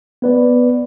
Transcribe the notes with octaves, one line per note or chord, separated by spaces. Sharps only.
B3 B4 D5